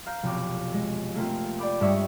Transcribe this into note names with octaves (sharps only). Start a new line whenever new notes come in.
F5 A#5 G6
F1 B1 D6
G#3
A3 A#3 C4 F4
D5 G5 B5 D6
G2 G#3 C#5 E5 D#6 B6